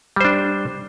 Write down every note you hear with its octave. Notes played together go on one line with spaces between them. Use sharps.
G3 D4 C5